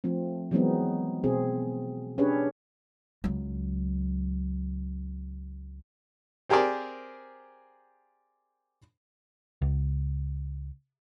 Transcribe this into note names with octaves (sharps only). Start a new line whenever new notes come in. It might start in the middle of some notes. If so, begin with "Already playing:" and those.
F3 A3 C4
E3 F#3 G#3 B3 C4 D#4
B2 C4 G#4
C#4 D4 G4 G#4 B4 C#5
C#2 F#3
C4 G4 G#4 A#4 C5 D5
C#2